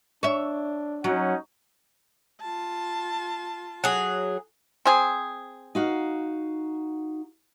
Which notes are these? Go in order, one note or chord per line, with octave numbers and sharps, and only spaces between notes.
D4 C#5 E5
F#3 C#4 D#4 F#5
F4 A5
F#3 G#4
C4 G#4
D#4 F#4 F5